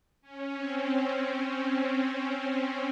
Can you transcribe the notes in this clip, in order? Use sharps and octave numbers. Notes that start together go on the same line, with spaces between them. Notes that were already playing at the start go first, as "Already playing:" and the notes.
C#4
C4